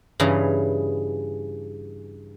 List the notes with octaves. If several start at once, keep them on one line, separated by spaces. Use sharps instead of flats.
G2 C#3 E3 G#4 A#5